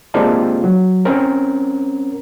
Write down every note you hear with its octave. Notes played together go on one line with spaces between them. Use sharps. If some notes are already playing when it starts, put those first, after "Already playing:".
G#3 A#3 C4 D4 F4 G4
F#3
C4 C#4 A#4